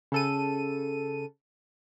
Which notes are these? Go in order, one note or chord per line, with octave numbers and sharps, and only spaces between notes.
C#3 A4 D#7